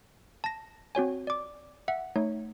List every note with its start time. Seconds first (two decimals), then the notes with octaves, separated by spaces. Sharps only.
0.44 A5 A#6
0.95 C4 F#4 C#5 G#5
1.27 D5 D6
1.88 E5 F#5
2.16 A3 D#4 C#5